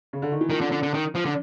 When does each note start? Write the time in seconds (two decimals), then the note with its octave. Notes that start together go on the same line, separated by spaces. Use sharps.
0.13 C#3
0.22 D3
0.32 D#3
0.41 E3
0.50 D#3 F3
0.61 D3
0.72 D3
0.83 D3
0.94 D#3
1.15 F3
1.26 D3